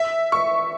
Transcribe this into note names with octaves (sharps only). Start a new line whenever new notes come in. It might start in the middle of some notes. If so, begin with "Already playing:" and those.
Already playing: E5
C#6